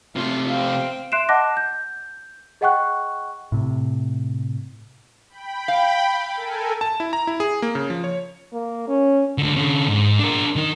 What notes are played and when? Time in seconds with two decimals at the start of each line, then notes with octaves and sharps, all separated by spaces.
0.16 C3 A3 F4
0.51 C4 F5
1.12 E5 C6 F#6 C7 D7 E7
1.29 D#5 F#5 A5 D6 F#6 A#6
1.57 G6
2.61 G#4 D#5 F#5 G5 C#6 F#6
3.52 A2 C3
5.29 G5 B5
5.68 F5
6.34 A4 A#4 G#5
6.81 A5
7.00 E4
7.13 A#5
7.27 E4
7.40 G#4
7.62 A#3
7.75 C#3
7.90 F3
8.04 C#5
8.53 A#3
8.88 C#4
9.38 C#2 D3
9.57 D3 C#4
9.88 G#2
10.19 D4 A#4
10.56 D#3 D#4